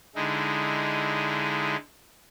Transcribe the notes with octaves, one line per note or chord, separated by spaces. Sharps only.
D3 G#3 D#4 E4